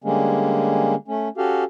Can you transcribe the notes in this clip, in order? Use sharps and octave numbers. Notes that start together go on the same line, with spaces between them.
D3 G3 G#3 A#3 C#4
A3 C#4
C#4 F#4 G4 A4 F5